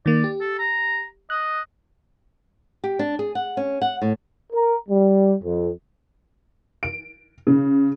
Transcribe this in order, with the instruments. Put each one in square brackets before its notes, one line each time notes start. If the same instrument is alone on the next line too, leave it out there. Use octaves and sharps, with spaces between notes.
[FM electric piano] D#3 A#3 [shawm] D5
[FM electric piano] G4
[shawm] A4
A#5
[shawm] D#5 [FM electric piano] F#6
[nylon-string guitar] G4
D4
G#4
F#5
C#4
F#5
A2
[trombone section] A#4
G3
F2
[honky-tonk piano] D7
C#3